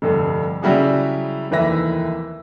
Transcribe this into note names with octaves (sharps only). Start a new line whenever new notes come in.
F1 G2 D3
C#3 F#3 G3 E4 F#4 G#4
F1 D#2 E3 B4 E5 A#6